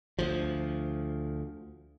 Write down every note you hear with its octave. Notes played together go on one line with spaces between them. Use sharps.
D2 F3